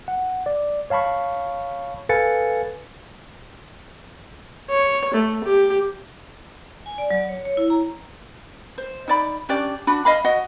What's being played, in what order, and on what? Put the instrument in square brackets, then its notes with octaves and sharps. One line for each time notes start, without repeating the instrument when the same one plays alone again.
[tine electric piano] F#5
D5
C#5 F5 A5 B5 C#6
A4 B4 F5 G#5 A6 C#7
[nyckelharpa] C#5
A3
G4
[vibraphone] G#5
D5
F#3
C#5
C#5
E4
A#5
[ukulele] C5
D#4 D5 B5
C#4 D4 G4 D5
D4 F#4 B5
D#5 F5 B5
F#4 D#5 F#5